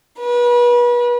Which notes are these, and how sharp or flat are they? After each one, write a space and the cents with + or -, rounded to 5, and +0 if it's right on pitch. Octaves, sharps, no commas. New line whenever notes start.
B4 -35